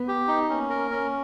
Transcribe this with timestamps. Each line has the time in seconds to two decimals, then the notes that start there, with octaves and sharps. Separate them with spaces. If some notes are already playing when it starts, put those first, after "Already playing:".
Already playing: B3
0.08 G4
0.28 D#4
0.49 A#3 C#4
0.70 A#4
0.91 C#4